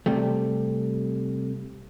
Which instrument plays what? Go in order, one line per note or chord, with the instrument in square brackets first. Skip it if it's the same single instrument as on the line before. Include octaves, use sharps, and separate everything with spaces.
[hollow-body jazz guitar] C3 G3 A3